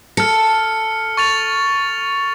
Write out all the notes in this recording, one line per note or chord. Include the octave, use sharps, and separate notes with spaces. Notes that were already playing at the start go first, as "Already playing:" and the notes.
A4 F6 C#7
C#6 A6 F7